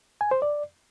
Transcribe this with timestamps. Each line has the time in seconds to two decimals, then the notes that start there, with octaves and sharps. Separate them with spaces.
0.21 G#5
0.31 C5
0.42 D5